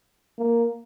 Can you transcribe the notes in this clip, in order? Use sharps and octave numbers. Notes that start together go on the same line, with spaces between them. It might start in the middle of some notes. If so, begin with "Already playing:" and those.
A#3